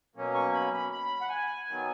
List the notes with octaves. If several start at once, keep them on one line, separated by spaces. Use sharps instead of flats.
B2 F#3 A#3 C#4
C#6
B5
B5
B5
F#5
G#5
D#3 F#3 B3